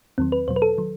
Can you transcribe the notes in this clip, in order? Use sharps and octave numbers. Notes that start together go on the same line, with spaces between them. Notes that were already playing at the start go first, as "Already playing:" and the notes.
E2 D#3 F#3 C4
B4
E2 B2 F#3 C5
B4
A4
D#3 F#3